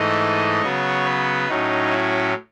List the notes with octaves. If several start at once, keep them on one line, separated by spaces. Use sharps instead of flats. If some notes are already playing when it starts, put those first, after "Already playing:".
Already playing: G#2 E3 A3 D#5
C#3 F#3 B3 C#5
B4
A2 F#3 C#4 D#4
E4